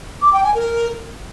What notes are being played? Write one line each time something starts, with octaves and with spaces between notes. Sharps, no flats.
D6
G5
G#5
A#4